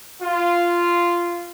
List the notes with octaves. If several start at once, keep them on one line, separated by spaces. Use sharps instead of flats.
F4